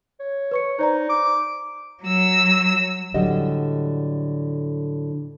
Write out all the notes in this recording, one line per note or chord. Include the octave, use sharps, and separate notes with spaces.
C#5
B4 C#6 C#7
D#4 C5 D5 A#5
D6
F#3 E6
A2 D3 F#3 G3 D#5